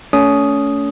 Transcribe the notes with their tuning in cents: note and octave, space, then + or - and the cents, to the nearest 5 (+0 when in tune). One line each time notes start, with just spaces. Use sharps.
A3 +0 C#4 +30 D#6 +0